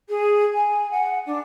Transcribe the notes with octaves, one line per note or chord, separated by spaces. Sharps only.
G#4
G#5
F#5
D4